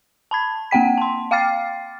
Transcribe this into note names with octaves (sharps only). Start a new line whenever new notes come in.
A5 B5 G#6
A#3 C4 F#5 G5 B6
A5 C6
F5 G5 D6 F6 A6 C7